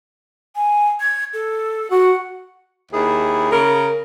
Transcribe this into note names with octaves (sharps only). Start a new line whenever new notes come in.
G#5
G#6
A4
F#4 F#5
D#2 E4 G#4
C#3 A#4